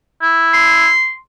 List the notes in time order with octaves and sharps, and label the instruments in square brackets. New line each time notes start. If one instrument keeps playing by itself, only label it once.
[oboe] E4
[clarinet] C6